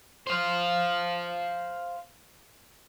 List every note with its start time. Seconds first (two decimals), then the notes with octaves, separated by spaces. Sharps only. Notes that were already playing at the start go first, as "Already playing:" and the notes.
0.27 C5 F5